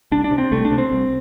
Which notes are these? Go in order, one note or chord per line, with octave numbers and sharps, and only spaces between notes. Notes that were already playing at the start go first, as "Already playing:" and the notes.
C2 D4
D4
C3
C4
C2 A3
D4
C3
C4
C2